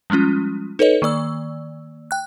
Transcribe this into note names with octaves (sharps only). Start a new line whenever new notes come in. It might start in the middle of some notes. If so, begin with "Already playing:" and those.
F3 G3 G#3 C#4 F4
D#4 A4 B4 C#5 D#5
D#3 A#3 D5 E6
G5 F#6